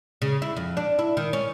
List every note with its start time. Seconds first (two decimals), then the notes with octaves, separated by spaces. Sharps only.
0.22 C#3
0.42 E4
0.57 F2
0.77 D4
0.99 E4
1.17 D#3
1.33 C#4